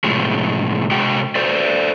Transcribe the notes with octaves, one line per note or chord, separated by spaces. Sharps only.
A2 C3 F3 G#3
C3 G#3 F#4 G5
A4 C5 D5